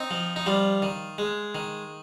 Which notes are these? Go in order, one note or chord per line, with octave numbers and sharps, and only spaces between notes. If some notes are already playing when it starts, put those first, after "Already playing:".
Already playing: C4 D#4
F3
D#4
G3 F4
D#3
G#3
D#3